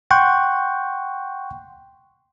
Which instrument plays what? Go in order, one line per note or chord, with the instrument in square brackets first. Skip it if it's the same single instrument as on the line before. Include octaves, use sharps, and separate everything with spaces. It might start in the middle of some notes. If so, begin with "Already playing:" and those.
[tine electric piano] F#5 G5 C6 C#6 F#6 G6